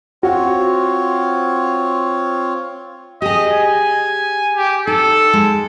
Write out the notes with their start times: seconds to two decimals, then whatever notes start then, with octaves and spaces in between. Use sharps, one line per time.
0.23 C4 F4 F#4 C#5
3.22 G4 G#4 D#5
3.51 G#5
4.56 G4
4.87 D#4 A4
5.33 G#3